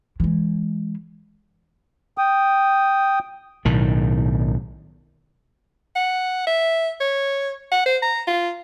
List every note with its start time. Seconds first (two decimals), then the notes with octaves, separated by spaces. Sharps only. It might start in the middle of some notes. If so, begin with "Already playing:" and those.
0.20 E3 G#3
2.18 G5 D#6
3.65 B1 A2 D#3
5.96 F#5
6.47 E5
7.01 C#5
7.72 F#5
7.86 C5
8.03 A#5
8.27 F4